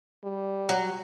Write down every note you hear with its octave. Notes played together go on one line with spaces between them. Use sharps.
G3
F#3